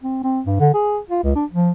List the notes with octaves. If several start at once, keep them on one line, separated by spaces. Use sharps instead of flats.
C4
C4
G2
D3
G#4
F4
C#2
D4
F3